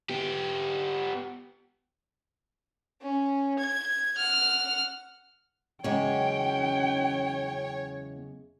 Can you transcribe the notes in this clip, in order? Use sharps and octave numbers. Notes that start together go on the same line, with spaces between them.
B3 G4
C#4
G#6
F#5 F6
E2 C#3 F#3 G#3 C#4 C#5 G5